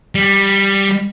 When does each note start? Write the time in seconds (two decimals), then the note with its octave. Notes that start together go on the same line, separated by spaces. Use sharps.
0.15 G3